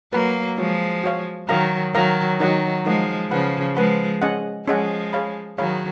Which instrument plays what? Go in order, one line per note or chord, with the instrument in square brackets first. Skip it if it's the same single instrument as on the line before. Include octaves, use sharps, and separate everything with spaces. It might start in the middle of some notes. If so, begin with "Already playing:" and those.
[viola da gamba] F#3 A#3 [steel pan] B4 F#5 B5
[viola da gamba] F3 G#3 [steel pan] F#4 C#5 F5
[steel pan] F#4 C#5 F5
[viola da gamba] D#3 F#3 [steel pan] A#4 F5 A#5
[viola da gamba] D#3 F#3 [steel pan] A#4 F5 A#5
[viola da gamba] D#3 F#3 [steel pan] D#4 A#4 D#5 F#5
[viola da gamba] F3 G#3 [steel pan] D#4 A#4 D#5 F#5
[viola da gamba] C#3 F3 [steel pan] B4 F#5 B5
[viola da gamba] F3 G#3 [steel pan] B4 F#5 B5
[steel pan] C#4 G#4 D#5 F#5
[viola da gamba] F3 G#3 [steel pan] C#4 G#4 D#5 F#5
[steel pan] G#4 C#5 F5 B5
[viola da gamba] D#3 F#3 [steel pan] G#4 C#5 F5 B5